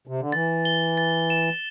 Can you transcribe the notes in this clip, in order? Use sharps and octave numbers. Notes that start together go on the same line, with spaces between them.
C3
D3
E3 A6
G7
A6
E7